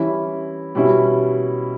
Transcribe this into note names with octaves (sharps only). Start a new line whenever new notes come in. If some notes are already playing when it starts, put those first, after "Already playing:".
Already playing: E3 G3 C#4 E4
B2 G3 C#4 E4